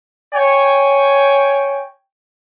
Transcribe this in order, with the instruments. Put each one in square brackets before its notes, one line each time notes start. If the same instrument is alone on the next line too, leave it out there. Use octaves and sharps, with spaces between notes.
[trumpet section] C#5 G5 G#5